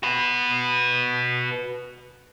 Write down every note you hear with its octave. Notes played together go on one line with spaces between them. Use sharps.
F#4 B4